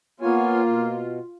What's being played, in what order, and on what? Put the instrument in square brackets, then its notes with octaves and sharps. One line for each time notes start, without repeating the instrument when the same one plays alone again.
[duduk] A#3 [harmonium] B3 C#5 G#5 [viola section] F4
[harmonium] B2